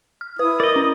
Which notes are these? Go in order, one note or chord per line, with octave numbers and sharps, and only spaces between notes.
F6
E4 B4 D#6
A#4 D5 D#5
C#4